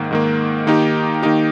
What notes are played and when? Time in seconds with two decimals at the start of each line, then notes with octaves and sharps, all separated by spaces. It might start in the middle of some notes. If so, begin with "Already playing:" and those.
Already playing: G#2 D#3 A#3
0.11 G#2 D#3 A#3
0.67 D#3 A#3 D#4 G4
1.22 D#3 A#3 D#4 G4